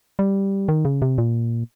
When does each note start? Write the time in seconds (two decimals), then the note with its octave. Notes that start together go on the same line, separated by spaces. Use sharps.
0.19 G3
0.68 D#3
0.85 C#3
1.02 C3
1.18 A#2